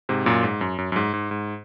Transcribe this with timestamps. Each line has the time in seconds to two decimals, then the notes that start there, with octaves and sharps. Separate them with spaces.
0.09 G#2 C3
0.26 F#2 A#2
0.43 G#2
0.61 F#2
0.78 F#2
0.92 F#2
0.96 G#2
1.14 G#2
1.31 G#2